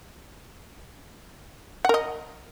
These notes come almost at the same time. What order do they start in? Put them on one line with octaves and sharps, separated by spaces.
F#5 A#4 D#5